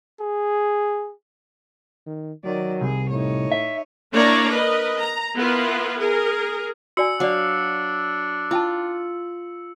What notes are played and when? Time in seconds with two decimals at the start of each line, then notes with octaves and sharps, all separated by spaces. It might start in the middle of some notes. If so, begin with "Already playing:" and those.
0.20 G#4
2.07 D#3
2.44 D#3 F#3 D5
2.81 C2 G#4
3.10 A2 D#4 C#5
3.52 E5
4.12 A#3 D4 E4 C#5 D5 A#5
4.52 A#4 B4 D#5
4.99 A#5
5.35 B3 E4 F4 A#4 B4
5.99 G#4 A#4
6.97 F#4 D5 G#5 E6 C#7
7.20 F#3 D4 D5 F5 F#5
8.51 E4 F4 G5 A5